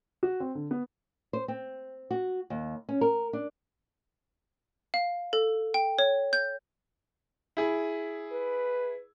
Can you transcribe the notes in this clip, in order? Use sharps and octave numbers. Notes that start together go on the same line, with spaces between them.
F#4
C4
D3
B3
C5
C4
F#4
D#2
C#4
A#4
D4
F5
A4
G5
C#5
G6
E4 G#4
B4